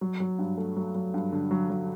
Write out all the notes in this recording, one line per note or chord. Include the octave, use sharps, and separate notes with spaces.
F#3
F#3
G2
A3
F#3
F#3
G2
D3
F#3
F#3